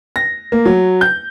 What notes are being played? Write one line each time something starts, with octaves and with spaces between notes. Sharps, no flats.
A#6
A#3
F#3
G6